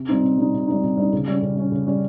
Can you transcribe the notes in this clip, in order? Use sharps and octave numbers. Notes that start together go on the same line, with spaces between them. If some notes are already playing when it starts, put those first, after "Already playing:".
Already playing: C3
G3 C4 D#4
C3
G3 C4 D#4
C3
G3 C4 D#4
C3
G3 C4 D#4
C#3
G3 C#4
C#3
G3 C#4
C#3
G3 C#4